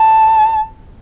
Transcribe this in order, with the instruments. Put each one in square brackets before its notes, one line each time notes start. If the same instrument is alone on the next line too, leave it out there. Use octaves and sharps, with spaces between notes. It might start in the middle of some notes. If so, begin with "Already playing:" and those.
Already playing: [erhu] A5